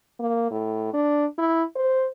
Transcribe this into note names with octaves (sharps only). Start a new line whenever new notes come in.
A#3
A2
D4
E4
C5